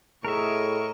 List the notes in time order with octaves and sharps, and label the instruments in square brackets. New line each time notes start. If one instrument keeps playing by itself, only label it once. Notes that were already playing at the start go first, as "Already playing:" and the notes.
[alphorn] A2 [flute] G#4 [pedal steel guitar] A#4 E5 [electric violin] D#5 C#6